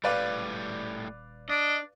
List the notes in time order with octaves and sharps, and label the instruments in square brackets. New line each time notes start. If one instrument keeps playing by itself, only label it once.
[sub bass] D#1 [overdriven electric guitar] A2 G3 [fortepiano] B4 D5 F5
[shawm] D4 [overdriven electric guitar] D#5